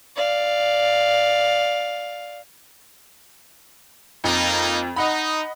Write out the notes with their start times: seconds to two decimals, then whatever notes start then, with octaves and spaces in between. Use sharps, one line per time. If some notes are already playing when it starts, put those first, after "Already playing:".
0.15 D5 F5
4.24 F2 A#3 D#4
4.96 D#4 D#5 F#5 B5